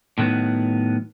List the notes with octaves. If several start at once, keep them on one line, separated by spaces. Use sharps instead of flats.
A2 D#3 F#3 B3